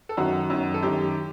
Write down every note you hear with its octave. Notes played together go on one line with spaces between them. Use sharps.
A4
F#2 D#3 F#4
F#2 D#3
A4
F#2 D#3 G4